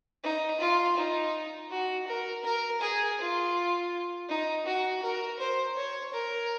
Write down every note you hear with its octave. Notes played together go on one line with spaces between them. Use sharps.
D#4
F4
D#4
F#4
A#4
A#4
G#4
F4
D#4
F#4
A#4
C5
C#5
A#4